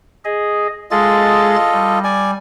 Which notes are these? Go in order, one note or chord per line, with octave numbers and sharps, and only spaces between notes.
G#4 D#5
G#3 F4 G#4 A4 D#5 A6
G3
D5 G#5